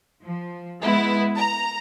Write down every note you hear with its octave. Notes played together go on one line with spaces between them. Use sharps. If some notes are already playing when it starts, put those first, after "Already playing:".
F3
G#3 B3 E4
A#5